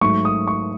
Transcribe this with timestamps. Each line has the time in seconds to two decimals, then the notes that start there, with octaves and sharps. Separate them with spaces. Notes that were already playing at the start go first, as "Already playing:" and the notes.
0.01 G#2 F#3 A3 C#6
0.25 D#6
0.47 C#6